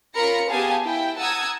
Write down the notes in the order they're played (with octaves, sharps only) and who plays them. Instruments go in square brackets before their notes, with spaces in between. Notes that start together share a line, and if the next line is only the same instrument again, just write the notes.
[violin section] C#4 F4 A#4 B5 A#6 C#7
B3 G4 G#4 F5 G#5 A5
E4 G5
F#5 A5 A#5 D#6 E6 G#6